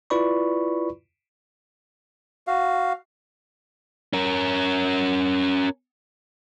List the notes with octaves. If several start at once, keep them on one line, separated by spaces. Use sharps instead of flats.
E4 F4 B4 D5 B5 C#6
F#4 F5
C#4 A#4